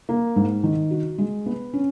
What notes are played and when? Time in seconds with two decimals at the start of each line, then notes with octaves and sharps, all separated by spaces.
0.09 A#3
0.36 G#2
0.63 D#3
0.91 F#4
1.18 G#3
1.46 B3
1.73 C#4